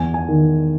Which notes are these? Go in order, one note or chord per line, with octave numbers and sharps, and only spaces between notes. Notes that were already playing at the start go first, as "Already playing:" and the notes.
Already playing: E2 G#5
G#5
D#3